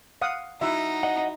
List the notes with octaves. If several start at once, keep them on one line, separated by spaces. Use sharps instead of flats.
F5 F#5 D#6
F#3 D#4 E4 F#4 E5
D#5 F#5